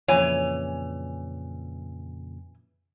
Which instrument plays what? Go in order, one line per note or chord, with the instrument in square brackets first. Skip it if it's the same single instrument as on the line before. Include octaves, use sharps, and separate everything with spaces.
[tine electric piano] F2 A#2 C#3 [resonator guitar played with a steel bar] E3 G#5 [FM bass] F3 [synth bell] C#5 F7